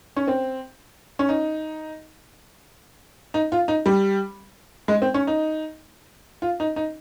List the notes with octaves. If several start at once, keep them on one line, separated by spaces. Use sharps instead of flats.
C#4
C4
C#4
D#4
D#4
F4
D#4
G3
G#3
C4
C#4
D#4
F4
D#4
D#4